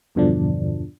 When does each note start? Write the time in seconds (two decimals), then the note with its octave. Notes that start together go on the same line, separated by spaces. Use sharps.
0.15 E2 G2 B2 D3 F3 D4